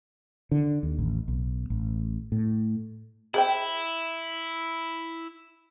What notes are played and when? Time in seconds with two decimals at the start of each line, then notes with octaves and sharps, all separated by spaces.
0.52 D3
0.83 D#2
0.99 A1
1.28 B1
1.70 A1
2.32 A2
3.34 E4 G#4 C5 G5